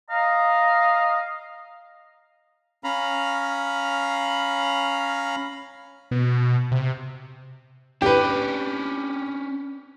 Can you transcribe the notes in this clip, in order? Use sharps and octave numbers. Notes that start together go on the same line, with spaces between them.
D#5 F5 A#5
C#4 F5 A#5 B5
B2
C3
C#4 D4 G4 B4